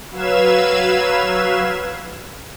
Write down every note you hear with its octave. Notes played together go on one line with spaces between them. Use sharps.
F#3 B4 F5 E6 G#6 E7